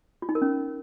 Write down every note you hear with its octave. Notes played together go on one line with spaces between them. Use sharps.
F4
D#4
A#4
C#4